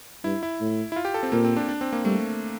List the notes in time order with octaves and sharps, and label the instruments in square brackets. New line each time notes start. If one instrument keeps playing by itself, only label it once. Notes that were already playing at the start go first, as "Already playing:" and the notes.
[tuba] G2 [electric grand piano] E4
[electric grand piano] E4
[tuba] A2
[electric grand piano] E4
F4
G4
A4
C4
[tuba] A#2 [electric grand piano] A#3
[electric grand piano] C4
D4
D4
C4
A#3
[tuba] G3 [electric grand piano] A3